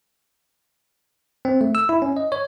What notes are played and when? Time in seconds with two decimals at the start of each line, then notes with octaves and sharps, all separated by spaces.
1.45 C4
1.61 A3
1.75 E6
1.89 E4
2.02 C#4
2.17 D#5
2.32 C#5